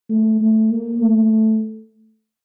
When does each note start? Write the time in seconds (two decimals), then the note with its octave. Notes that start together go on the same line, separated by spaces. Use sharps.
0.10 A3
0.41 A3
0.71 A#3
1.03 A3